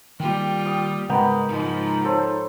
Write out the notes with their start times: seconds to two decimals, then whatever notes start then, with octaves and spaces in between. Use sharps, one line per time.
0.20 D#3 G3 A#3 F4 G5
0.66 D#6
1.09 G#2 C#3 G#3 B3 A#4 G5 A#5
1.48 G#2 F3 D#4
2.04 A4 C5 C#5